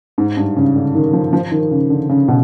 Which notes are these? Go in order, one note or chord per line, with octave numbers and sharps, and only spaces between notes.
G#2
G2
C#3
D3
D#3
F3
F3
D#3
C#3
D3
C#3
B2